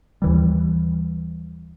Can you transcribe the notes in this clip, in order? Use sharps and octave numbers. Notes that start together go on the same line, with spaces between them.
D#2 E3 G3